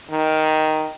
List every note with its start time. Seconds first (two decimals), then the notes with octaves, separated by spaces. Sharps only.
0.11 D#3